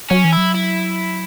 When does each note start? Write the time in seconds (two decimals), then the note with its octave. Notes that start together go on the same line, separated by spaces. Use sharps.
0.10 F#3 C#4
0.24 E3
0.32 F#3 E4
0.54 E4